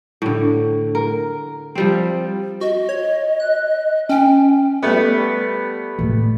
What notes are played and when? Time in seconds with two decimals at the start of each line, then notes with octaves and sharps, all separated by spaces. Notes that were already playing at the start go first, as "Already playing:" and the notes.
0.22 A2 D3
0.95 A#4
1.75 F3 G3 C4
2.61 F#4 D#5
2.89 C#5
3.40 F#6
4.09 C#4 G5
4.82 G3 A3 B3
5.99 E2 A2